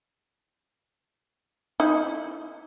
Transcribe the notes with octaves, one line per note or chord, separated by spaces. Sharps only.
D#4 E4